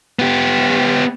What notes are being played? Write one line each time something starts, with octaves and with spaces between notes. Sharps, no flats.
B3 G4